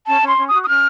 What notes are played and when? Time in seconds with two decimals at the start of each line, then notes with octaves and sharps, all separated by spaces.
0.07 C#4 A5
0.22 C#4
0.27 C6
0.37 C#4
0.48 F#4 D#6
0.63 D#6
0.68 C#4 F6